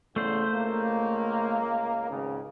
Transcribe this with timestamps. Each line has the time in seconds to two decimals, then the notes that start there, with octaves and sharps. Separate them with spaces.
0.16 E2 G#2 C#3 A3 C5
0.54 C#2 A#3
2.10 G#1 C#2 C#3